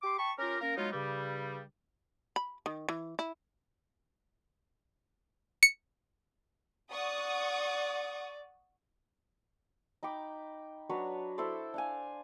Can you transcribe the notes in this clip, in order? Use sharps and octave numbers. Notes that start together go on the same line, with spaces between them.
G4 C6 D6
G5 A5 B5 C#6
C#4 F4 G4 A#4
A#3 C#4 A#4
F#3 G#3 B3 D#4 F4
G2 C#3 G3
B5
D#3
E3
E4
C#7
D5 F#5 C#6 D#6
D#4 G5 B5 D6
F#3 D4 B4 C#5
E4 A4 C5 D5
D4 F5 G#5